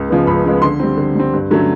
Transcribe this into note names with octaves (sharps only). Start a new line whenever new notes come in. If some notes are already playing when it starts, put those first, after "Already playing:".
Already playing: C#2
C#3 F3 G#3 B3
C#2 B5
C#3 F3 G#3 B3
B5
D3 C6
G3 C4
D3
G3 C4
G2
D3 F#3 A3 C#4